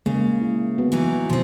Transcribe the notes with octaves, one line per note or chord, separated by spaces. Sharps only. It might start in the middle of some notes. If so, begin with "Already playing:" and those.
C#3 G#3 A#3
E4
B3 F#4
E3 F#3 D#4
B2 F3 C4